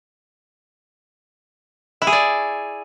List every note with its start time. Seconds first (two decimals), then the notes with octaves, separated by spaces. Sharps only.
2.02 E4
2.07 G#4
2.12 D5